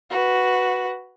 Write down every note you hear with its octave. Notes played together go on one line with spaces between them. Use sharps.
F#4 B4